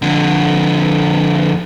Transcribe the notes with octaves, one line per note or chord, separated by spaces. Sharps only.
F2 D3